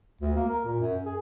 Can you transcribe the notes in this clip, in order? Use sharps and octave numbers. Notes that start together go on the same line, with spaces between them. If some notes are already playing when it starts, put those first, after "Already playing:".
D2
A#3
A#4
A#2
F#2
G#4